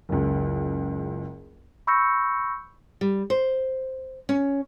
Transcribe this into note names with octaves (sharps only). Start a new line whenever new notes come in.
F#1 C#2
B5 C#6 E6 G6 A#6 C#7
G3
C5
C#4